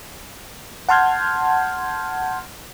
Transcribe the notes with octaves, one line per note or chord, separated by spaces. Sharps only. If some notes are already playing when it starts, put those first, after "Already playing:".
F#5 A5 C6 F6 G6 G#6